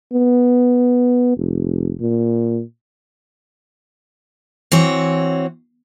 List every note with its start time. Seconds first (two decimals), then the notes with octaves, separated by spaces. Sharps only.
0.13 B3
1.37 F1
2.01 A#2
4.72 E3 C4 F#4 C#5